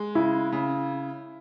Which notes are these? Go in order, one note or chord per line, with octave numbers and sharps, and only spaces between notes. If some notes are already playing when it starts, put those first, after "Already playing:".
Already playing: G#3
C#3 E4
C#3